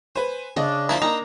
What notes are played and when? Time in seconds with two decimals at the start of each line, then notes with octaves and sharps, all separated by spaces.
0.16 B4 C5 G#5
0.56 C#3 D4 D#5
0.89 F3 A#3 E4 A5 B5 C6
1.02 A#3 D#4 A#5